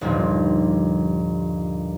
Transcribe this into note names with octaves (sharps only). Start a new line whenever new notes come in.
G1 D#2 A#2 F3